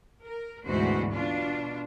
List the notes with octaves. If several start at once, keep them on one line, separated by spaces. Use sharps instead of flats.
A#4
D2 G#2 B2 E3 F#4 C5
B2 D4 F4